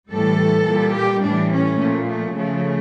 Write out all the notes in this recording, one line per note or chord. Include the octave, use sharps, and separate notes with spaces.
A2 E3 G3 A4
A#2 G3
G4
A2 E3 G3 D4
C#4
A#2 F3 A3
A3
C#3 F3 A3